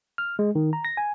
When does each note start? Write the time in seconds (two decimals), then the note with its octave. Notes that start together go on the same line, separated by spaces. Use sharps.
0.18 F6
0.39 G#3
0.55 D#3
0.73 A#5
0.85 A#6
0.97 G#5